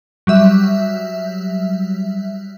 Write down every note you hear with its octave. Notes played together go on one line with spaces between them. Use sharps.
F#3 G3 E5